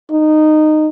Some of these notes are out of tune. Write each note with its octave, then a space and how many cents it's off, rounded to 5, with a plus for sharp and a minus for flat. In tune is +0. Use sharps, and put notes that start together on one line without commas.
D#4 -15